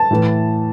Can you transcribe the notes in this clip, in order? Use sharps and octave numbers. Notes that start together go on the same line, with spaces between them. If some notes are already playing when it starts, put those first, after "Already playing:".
Already playing: A5
A2 E3